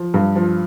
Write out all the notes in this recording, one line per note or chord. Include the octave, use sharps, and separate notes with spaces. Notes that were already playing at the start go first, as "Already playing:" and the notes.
Already playing: F3
G2
F3